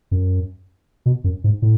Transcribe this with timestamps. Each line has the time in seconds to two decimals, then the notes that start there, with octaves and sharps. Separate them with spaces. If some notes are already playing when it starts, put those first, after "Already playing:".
0.11 F#2
1.06 B2
1.24 F#2
1.44 G#2
1.62 A2